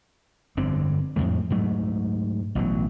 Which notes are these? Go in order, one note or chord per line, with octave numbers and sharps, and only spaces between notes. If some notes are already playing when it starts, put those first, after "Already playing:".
G1 F2 D3 C4
F2 A2 F3 G#3
G#2 F#3 A3
A1 B2 F#3